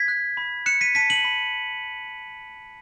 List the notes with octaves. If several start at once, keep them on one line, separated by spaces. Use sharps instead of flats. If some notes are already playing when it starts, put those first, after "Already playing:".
Already playing: G#6 B6
F#6
B5
F#6 C#7 E7
B6 D#7
A5 B6 D#7
D#7 F#7
B5